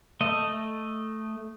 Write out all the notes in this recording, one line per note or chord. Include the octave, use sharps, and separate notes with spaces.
A3 D#5